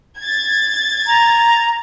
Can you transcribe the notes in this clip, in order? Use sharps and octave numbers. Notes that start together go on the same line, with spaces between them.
G#6 A6
A#5